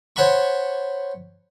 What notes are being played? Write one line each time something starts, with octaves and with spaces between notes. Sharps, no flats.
C5 C#5 F#5 A5 B5 C#6